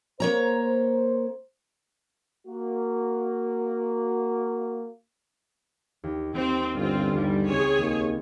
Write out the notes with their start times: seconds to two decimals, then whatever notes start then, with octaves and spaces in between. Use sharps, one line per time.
0.20 A#3 C5 C#5 A#5
2.47 A#3 F#4
6.04 D#2
6.35 D#2 C4
6.74 G1 C4 F4
7.15 D#2 G3
7.47 C#2 C4 G#4 C#5 G#5 E7
7.79 D#2